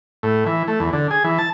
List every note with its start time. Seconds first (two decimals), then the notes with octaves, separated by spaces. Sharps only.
0.23 A2
0.46 E3
0.68 A3
0.80 E2
0.93 D3
1.11 G#4
1.24 E3
1.38 A5